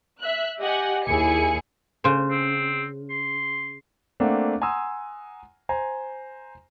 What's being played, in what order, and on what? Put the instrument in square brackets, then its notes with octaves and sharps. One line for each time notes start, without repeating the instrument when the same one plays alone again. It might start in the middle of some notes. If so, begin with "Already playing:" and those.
[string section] E5 F#6
G4 D#5 F#5 G#5
D#2 E4 G#4 G#5 C#7
[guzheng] C#3 C5
[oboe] C4
C6
[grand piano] A3 A#3 C4 D4 F#5
F#5 G#5 A#5 C6 D#6 E6
C5 G#5 A#5